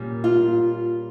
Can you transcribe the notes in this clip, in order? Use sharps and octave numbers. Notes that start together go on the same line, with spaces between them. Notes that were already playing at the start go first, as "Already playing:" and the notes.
Already playing: A#2 G3 A#3 C#4
F4